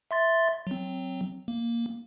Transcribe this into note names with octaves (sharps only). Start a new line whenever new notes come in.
E5 C6 A6
F#3 C4
A#3